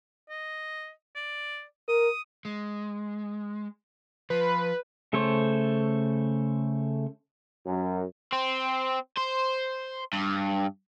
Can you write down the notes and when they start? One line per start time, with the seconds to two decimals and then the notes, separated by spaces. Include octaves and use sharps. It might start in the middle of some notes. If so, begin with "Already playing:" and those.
0.29 D#5
1.16 D5
1.88 A#4 D#6
2.45 G#3
4.30 F3 B4
5.13 C#3 A3 A4 C5 C#5
7.66 F#2
8.32 C4
9.17 C5
10.13 G2